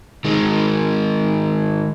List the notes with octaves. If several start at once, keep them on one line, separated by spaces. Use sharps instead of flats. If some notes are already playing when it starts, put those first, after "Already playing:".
D#3 G#3